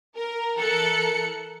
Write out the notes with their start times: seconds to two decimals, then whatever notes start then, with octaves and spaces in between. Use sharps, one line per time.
0.15 A#4
0.56 E3 A4 A#4 F#6 C#7